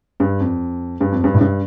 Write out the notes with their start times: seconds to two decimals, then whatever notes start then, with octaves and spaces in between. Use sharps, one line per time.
0.20 G2
0.40 F2
1.01 G2
1.12 F2
1.24 G2
1.34 A2
1.41 G2